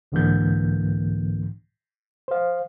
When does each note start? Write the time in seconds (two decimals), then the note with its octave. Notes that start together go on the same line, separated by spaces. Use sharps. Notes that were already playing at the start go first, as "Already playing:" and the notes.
0.12 C2 G#2 D3 E3 A#3 G6
2.28 C5 F5